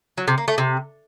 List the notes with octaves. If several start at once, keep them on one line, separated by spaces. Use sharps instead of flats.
F#3
C3
A#3
A3
C3